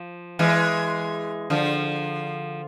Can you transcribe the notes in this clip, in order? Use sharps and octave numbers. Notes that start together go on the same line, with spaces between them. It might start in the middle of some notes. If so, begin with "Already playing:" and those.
Already playing: F3
E3 G#3
D3 F3